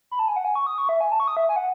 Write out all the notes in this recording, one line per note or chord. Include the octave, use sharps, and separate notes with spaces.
B5
A5
G#5
F#5
G#5
C#6
D#6
C#6
E5
G#5
A5
C#6
D#6
E5
G#5
F#5